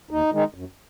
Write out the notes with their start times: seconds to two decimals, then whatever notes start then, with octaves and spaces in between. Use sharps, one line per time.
0.11 D#2 D#4
0.33 D#3 G#3 D#4
0.55 F#2